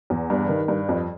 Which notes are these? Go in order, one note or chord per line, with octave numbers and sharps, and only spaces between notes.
E2
G2
D#3
G2
F2